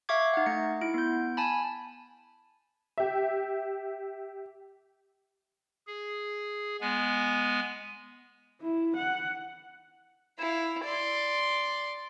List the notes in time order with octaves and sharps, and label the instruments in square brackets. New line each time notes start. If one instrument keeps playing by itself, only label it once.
[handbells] E5 F5 C#6 D6 G#6
D#4 F#5
A3 C#7
E4 D7
B3 G6
G#5 A5 B5
[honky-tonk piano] G4 E5
[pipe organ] G#4
G#3 B3 G#5
[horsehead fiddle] E4
F#5
[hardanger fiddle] E4 F5
D5 C6